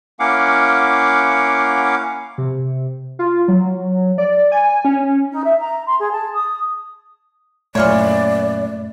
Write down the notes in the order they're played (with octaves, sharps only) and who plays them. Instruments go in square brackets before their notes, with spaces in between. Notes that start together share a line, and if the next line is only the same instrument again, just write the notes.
[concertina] A#3 C#4 E4 F5 F#5 D6
[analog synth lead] C3
F4
F#3
D5
G#5
C#4
[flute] D#4
E5
A#5
C6
G#4
A5
D#6
[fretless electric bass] F#2 A#2 [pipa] E3 F4 C#5 [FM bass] A3 [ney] D5